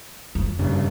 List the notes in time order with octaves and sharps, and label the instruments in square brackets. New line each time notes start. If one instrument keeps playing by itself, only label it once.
[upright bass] F2
[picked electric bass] G2 C#3 G3